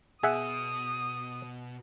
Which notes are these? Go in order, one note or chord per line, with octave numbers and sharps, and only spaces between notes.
B2 G#4 E5 F#5 D#6